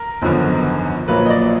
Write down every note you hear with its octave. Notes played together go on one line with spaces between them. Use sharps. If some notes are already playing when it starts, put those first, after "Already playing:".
Already playing: A#4
G#1 F#2 D3 F3 B3
A#1 A#2 F#3 A#3 B4
D#5
D5